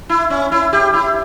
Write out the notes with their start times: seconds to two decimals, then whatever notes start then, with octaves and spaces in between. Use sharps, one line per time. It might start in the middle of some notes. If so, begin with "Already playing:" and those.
0.09 E4
0.30 C#4
0.52 E4
0.73 G4
0.94 E4